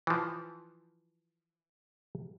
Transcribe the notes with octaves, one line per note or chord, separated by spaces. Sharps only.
E3 F3